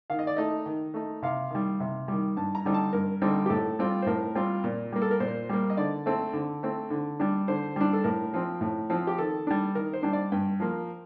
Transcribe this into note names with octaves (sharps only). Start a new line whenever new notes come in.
D#3 F5
D#5
D5
A3 D#4 D#5
D#3
A3 D#4
C3 F5
D#3 G3
C3
D#3 G3
G2 A5
A#5
D3 G3 C4 D#4
A5
G2 A#4
D3 G3 C4 D#4
G4
A2 A4
G3 C4 F4
C5
A2 A#4
G3 C4 F4
A#2
G3 A#3
A4
A#4
A#2 C5
G3 A#3
D#5
D3 D5
A3 C4
D3
A3 C4
D3
G3 D4
D3 C5
G3 D4
A4
A2 A#4
F3 C4
A2
F3 C4
G4
D#3 A4
G3 D4
D#3 A#4
C5
G3 D4
D5
G2 G5
F3 A#3